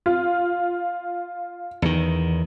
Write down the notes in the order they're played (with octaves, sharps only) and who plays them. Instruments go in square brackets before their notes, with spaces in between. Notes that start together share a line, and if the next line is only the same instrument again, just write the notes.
[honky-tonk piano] F4
[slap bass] E2 D#3